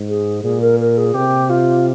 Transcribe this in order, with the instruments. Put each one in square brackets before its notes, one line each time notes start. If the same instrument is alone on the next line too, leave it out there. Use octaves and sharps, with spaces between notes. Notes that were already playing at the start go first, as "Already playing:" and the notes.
Already playing: [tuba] G#2
[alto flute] G#4
[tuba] A#2 [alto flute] G#4
[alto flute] A#4
A#4
G#4
[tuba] C3 [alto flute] G4
[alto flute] F4